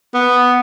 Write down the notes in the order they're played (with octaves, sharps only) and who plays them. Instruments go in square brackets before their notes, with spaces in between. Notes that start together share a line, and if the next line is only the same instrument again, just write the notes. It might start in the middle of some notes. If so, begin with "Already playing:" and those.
[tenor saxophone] B3